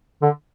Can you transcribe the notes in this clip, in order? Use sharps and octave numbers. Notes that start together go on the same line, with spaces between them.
D3